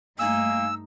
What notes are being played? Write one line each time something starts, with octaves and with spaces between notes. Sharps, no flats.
G2 A3 A#3 D#4 G#5 E6